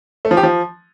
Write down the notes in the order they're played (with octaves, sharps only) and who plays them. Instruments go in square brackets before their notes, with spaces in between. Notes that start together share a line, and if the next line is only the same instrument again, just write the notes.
[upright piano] A3
F3
G4
F3